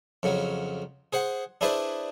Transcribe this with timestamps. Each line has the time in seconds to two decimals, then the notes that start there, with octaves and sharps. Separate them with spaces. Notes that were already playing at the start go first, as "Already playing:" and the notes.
0.23 F2 C#3 F#3
1.13 G#4 C5 F#5
1.61 D4 E4 G#4 B4 C5 D5